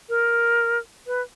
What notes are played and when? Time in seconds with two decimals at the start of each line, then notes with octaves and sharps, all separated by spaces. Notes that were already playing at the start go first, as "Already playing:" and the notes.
0.09 A#4
1.07 B4